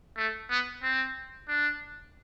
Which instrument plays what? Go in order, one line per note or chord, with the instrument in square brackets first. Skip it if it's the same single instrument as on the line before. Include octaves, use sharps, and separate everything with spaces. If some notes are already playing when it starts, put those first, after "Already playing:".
[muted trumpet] A3
B3
C4
D4